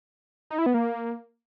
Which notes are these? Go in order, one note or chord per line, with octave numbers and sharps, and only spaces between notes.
D#4
E4
B3
A#3